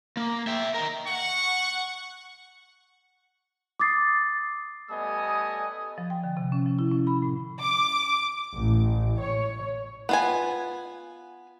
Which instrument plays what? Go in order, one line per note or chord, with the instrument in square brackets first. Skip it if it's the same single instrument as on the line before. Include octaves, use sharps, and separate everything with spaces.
[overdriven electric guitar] A#3
E5 G5
A#4 D#5
[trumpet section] F#5 C#6
[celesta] D6 D#6 A6 C7
[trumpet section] G3 A3 B3 D#5 G#5 D#6
[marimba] F3
G5
D3
C3
C#4
F3
E4
C#4
B5
A2
[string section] D6
A1
C#5
[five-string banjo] B3 F4 G#5